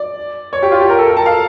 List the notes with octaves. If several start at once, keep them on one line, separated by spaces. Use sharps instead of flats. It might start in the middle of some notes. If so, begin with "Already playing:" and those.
Already playing: D5
C#5
G4
F4
G4
A#4
A4
A#4
A5
F5